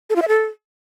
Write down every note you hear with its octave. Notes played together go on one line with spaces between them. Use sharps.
A4
F4
E5
A4